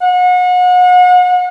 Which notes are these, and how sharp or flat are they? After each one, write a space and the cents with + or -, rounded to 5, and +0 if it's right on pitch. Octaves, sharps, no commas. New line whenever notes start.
F#5 -35